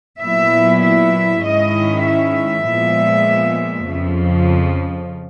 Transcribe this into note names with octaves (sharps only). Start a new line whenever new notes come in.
A#2 F#3 B3 E4 E5
E5
G#2 D#3 G#3 C#4 E4 D#5
E5
A#2 F3 G#3 B3
F2 C#3 F3